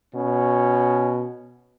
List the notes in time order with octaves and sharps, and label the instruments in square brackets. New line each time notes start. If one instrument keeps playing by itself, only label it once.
[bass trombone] B2 [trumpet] C#4